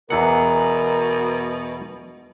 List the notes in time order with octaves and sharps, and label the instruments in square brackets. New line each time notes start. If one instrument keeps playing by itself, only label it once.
[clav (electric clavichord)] E2 E3 F#5 [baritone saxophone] B2 [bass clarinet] A#4